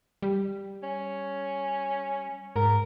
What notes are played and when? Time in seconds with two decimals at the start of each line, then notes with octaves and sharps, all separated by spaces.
0.22 G3
0.83 C#4
2.56 G#2 A#4